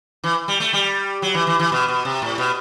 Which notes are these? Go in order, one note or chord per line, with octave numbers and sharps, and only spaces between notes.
E3
G3
A3
G3
F#3
E3
E3
E3
B2
B2
C3
A2
B2